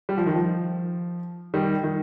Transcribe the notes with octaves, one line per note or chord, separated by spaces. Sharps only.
G3
F3
D#3
F3
D#3 G3
D#3